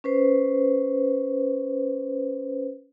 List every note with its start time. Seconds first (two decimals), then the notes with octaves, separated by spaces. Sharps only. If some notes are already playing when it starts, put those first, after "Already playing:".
0.04 C#4 B4 C5